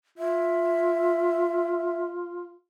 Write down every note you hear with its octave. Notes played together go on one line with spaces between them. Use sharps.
F4 E5